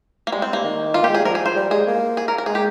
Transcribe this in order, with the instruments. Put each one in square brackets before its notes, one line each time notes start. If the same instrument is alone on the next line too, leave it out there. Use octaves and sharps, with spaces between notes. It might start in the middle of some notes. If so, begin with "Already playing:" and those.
[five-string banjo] A#3
[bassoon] G3 [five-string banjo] G#3
[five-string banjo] C4
A#3
[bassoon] D#3
[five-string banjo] F4
[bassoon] A#3 [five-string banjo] G4
[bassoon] G#3
[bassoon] G3 [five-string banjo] G#4
[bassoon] F3 [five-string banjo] A#4
[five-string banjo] G#4
C5
[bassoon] G3
[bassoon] G#3 [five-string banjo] G#4
[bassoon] A#3
[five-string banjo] G#4
A#4
A#4
[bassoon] G#3 [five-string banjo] G#4
[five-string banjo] G4